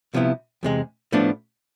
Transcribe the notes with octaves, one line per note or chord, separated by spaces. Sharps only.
C2 C3 F3 B3 E4
E2 C3 G#3
A2 F3 B3 D4